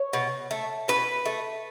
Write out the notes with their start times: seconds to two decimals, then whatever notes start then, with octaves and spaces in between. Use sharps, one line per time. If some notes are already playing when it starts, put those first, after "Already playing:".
Already playing: C#5
0.13 B2
0.51 A3
0.88 B2 B4
1.26 A3